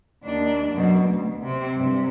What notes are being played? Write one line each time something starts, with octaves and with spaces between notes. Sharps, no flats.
D#2 D4
F#2 B2
D2
C3 C4
G2 C3